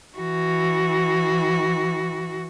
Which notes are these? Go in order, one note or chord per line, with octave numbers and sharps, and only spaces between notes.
E3 F#4